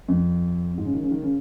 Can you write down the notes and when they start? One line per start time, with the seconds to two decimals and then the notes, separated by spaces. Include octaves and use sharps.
0.08 F2
0.78 G#2
0.85 C#3
0.94 D#3
1.03 C#3
1.11 D#3
1.23 C#3